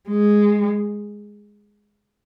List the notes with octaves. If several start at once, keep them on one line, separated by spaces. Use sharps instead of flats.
G#3